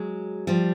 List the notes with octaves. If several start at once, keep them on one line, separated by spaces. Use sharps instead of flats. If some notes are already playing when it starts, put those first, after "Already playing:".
Already playing: F#3 G#3
F3 G3